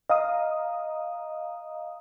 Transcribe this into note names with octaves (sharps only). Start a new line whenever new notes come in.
D#5 F5 A#5 D#6